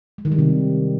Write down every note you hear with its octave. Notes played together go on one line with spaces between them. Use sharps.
G#3
D#3
G3
C3